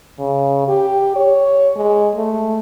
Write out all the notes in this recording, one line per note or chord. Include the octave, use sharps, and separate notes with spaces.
C#3
G4
C#5
G#3
A3